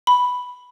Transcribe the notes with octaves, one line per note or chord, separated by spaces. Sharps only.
B5